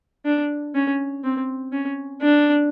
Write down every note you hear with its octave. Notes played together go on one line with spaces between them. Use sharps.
D4
C#4
C4
C#4
D4